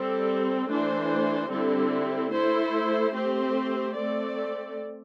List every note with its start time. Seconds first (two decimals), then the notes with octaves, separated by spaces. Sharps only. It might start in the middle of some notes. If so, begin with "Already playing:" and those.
Already playing: G3 C4 A4
0.69 E3 A3 D4 C5
1.49 D3 G3 C4 E4 A4
2.31 A3 E4 A4 C5
3.12 A3 C4 G4 C5
3.94 A3 C4 A4 D5